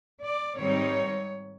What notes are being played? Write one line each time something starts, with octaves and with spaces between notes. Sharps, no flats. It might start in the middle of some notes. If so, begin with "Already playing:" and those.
D5
G#2 D#3 G3 C4 D#4 C#5